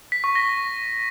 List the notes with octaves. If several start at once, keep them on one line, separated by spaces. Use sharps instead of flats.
B6
C#6
A#6